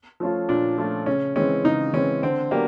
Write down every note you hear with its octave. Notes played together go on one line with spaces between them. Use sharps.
F3 A3 C#4 F4
A#2 D4
F3 A3 C#4 F4
C#3 C#4
E3 G#3 C4 C#4
C#3 D#4
E3 G#3 C4 C#4
D3 C4
F#3 A#3 B3 D4 G4